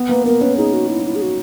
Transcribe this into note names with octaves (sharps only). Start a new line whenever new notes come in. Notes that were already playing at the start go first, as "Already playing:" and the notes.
Already playing: B3
A#3 B4
B3 A#4
C#4 B4
D#4 G#4
F#4
E4
E4
G#4
F#4